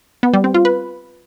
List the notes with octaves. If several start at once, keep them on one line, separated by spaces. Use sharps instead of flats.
B3
G3
C4
F4
B4